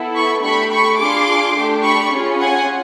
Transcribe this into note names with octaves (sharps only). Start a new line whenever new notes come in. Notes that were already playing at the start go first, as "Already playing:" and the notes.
Already playing: B3 E4 A4
B5 C#6
A3 D4 G4 B5 C#6
B5 C#6
D4 F4 G#4 C6 D6
A3 D4 G4
B5 C#6
C#4 F4 G#4
F#5 G#5